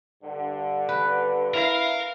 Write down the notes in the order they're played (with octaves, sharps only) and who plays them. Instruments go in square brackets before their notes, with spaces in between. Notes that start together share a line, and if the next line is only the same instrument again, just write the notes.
[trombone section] G2 D3
[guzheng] B4
[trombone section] E4 [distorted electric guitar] A#4 [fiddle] F5